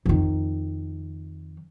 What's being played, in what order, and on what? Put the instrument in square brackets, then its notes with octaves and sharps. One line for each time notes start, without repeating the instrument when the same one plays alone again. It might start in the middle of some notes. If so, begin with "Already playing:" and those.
[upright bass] F2 D#3